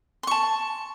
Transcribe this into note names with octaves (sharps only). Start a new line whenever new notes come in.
A5 C6 C#6